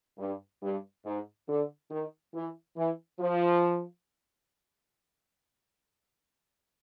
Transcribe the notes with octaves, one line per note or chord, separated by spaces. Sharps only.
G2
G2
G#2
D3
D#3
E3
E3
F3